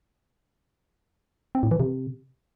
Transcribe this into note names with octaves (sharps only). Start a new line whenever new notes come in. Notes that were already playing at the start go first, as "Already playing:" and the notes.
C4
A2
E3
C3